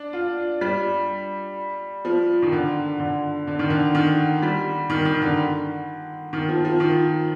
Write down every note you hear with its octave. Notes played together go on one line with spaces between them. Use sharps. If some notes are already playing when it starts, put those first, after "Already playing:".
Already playing: D4
F4
G3
F3
D#3
D3
D3
D3
D#3
D3
D#3
G3
D#3
D#3
D3
D#3
F3
F3
D#3